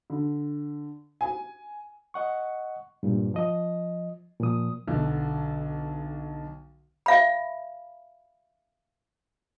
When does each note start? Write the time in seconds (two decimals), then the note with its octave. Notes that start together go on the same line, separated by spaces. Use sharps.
0.10 D3
1.21 G#5
2.14 D#5 F#5 C#6
3.03 G2 A#2
3.34 F3 D#5
4.40 A#2 F3 D#6
4.88 B1 D3
7.06 E5 F5 B5